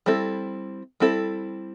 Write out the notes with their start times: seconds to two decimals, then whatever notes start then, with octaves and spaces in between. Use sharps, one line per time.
0.06 G3 C4 E4 A4
1.00 G3 C4 E4 A4